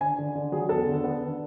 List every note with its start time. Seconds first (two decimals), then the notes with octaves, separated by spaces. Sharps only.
0.01 D3 G#5
0.18 D3
0.35 D3
0.52 F#3 G#4
0.69 E2 A4
0.87 D3
1.03 B3
1.20 D3